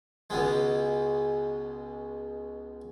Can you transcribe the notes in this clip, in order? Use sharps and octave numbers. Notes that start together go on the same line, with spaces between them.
C#2 B2 G#3